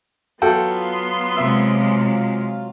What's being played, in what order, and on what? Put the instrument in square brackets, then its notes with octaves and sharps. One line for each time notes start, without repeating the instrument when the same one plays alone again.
[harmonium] F#3 F4 [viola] B3 C6 [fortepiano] F#4 A4 G5
[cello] C3 G#3 [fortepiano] E5